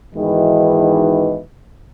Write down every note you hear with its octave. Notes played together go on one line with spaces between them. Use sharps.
G#2 B2 D#3 E3